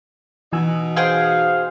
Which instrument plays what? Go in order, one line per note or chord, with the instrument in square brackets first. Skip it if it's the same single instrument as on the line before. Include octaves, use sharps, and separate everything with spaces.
[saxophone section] B2 D#4 F#4 [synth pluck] E3 G#5 E6
[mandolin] G#4 C5 G5 [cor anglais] F5